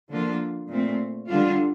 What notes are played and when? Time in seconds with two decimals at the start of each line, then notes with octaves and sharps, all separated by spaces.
0.10 D3 F3 A#3 D4 F4
0.69 A#2 A3 C4
1.28 D3 G3 D4 F4